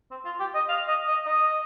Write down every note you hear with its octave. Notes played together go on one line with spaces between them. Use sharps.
C4
F4
G4
D#5
F5
D#5
D#5
D#5